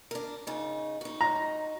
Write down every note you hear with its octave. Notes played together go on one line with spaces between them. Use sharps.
D4 A#4
C#3 D#4
D#4 F#4
A#5